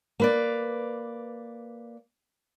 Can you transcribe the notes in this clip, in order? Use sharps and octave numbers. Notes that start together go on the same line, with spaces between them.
A#3 B4 D5